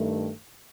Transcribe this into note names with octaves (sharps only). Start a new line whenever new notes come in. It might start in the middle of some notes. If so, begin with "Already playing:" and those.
Already playing: G2 D#3 A3